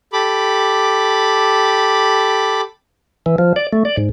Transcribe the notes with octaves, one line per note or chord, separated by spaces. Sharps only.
G4 A4 B5 D6
E3
F3
D5
A3
D5
G#2